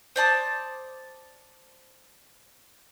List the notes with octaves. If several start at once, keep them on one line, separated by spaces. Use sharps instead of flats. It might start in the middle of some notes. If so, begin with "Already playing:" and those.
C5 D5 A5 D#6